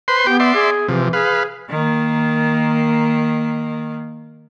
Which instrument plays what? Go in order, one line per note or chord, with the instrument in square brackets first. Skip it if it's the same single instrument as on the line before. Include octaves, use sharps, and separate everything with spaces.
[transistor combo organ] B4 C5 C6
[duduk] B3 [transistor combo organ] G4 G5
[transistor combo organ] D5 E5 C6
[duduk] G#4
[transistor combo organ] C3 F3 [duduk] E3
[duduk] G#4 [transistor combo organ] B4 F5
[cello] D#3 A#3